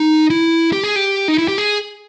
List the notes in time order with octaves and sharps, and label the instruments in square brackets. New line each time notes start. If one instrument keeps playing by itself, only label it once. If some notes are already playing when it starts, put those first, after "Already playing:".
Already playing: [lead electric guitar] D#4
E4
G4
G#4
G4
D#4
E4
G4
G#4